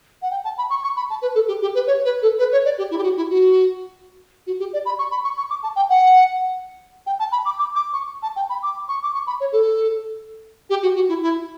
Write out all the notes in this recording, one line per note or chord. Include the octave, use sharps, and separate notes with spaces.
F#5
G5
A5
B5
C#6
C#6
B5
A5
B4
A4
G4
G4
B4
C#5
B4
A4
B4
C#5
D5
G4
E4
G4
F#4
E4
F#4
F#4
G4
D5
B5
C#6
B5
C#6
C#6
D6
A5
G5
F#5
G5
A5
B5
D6
D6
D6
C#6
A5
G5
B5
D6
C#6
D6
C#6
B5
C#5
A4
G4
F#4
F#4
E4
E4